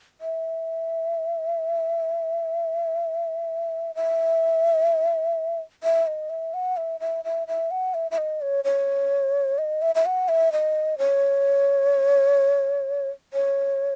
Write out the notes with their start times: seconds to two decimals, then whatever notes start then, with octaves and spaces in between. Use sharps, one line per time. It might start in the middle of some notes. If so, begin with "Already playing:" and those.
0.21 E5
3.95 E5
5.83 E5
6.07 D#5
6.30 E5
6.54 F#5
6.77 E5
7.00 E5
7.25 E5
7.48 E5
7.71 F#5
7.94 E5
8.11 E5
8.18 D#5
8.41 C#5
8.65 C#5
9.58 D#5
9.82 E5
9.95 E5
10.06 F#5
10.29 E5
10.52 D#5
10.98 C#5
13.33 C#5